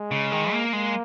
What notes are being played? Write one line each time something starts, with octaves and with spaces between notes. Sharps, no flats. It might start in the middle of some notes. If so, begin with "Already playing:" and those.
Already playing: G#3
C#3
D#3
A#3
G#3 A#3